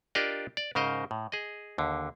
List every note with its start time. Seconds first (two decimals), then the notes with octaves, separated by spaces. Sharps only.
0.15 D4 F4 G4 A#4 D5 D#5
0.57 D5
0.75 G#2 C#3 A#4 C5 D#5
1.11 A2
1.32 G#4 D#5
1.78 D#2 D3